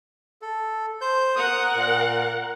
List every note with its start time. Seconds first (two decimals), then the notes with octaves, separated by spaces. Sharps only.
0.42 A4
1.01 C5 G6
1.36 A#4 F#5 D#6
1.76 A#2